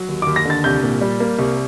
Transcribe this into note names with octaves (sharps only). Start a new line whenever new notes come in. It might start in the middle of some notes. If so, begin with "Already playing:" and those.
Already playing: F#3
D#2
D#2 D6
A#6
D3 A6
C2 G6
A#2
G3
A#3
C2